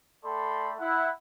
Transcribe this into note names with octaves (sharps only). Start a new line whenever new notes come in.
A3 A4 D5 G5 B5 C6
E4 F#5